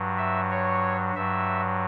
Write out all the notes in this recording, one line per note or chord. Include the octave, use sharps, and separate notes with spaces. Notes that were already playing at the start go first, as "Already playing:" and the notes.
Already playing: G2 F#3
E5
C#5
G2 F#3 E5